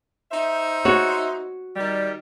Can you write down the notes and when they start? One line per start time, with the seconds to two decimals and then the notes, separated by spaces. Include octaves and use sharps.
0.31 D#4 C5 E5
0.85 F#4 C#5
1.76 D#3 G3